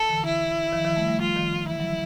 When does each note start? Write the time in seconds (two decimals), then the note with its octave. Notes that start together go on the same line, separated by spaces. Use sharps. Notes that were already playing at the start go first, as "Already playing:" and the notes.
Already playing: A4
0.09 D3 E3
0.25 E4
0.73 D#3 F3
0.85 D#3 F3
0.96 G3 A3
1.08 G3 A3
1.20 F3 G3 F4
1.36 D#3 F3
1.67 D3 E3 E4
1.80 F#3